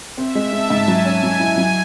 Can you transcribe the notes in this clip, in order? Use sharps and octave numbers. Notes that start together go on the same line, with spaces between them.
C4 E5
G#3
G#3 A5
G#2
F#3 G#5
C#4
F#3
E4
F#3